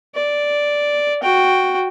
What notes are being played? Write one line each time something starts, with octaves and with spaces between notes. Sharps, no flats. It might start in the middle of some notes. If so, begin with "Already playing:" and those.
D5
F#4 G5